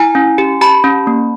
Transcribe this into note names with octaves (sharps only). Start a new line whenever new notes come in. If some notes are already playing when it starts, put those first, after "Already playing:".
Already playing: E4 G#5 A#5
C#4
G4
G4 A5 B5
C#4
A#3